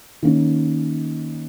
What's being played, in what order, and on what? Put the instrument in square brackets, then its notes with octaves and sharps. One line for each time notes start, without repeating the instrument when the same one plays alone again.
[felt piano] D#3 A#3 C#4